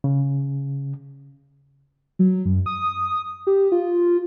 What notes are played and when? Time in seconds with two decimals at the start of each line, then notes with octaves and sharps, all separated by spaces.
0.04 C#3
2.19 F#3
2.45 F#2
2.66 D#6
3.47 G4
3.72 F4